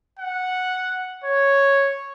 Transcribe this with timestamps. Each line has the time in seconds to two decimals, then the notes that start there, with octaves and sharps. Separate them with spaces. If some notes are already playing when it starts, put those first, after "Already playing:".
0.19 F#5
1.24 C#5